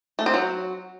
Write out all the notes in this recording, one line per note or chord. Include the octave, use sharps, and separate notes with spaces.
A3
C4
F#3